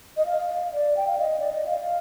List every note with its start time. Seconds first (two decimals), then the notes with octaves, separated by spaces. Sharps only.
0.17 D#5
0.26 F5
0.73 D5
0.97 G5
1.07 F5
1.19 D#5
1.40 D5
1.53 D#5
1.66 F5